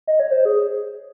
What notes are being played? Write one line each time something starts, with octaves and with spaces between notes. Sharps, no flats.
D#5
C#5
C5
G#4